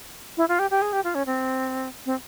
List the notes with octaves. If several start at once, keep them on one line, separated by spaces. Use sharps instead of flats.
E4
F4
G4
G4
G#4
G4
F4
C#4
C4
C4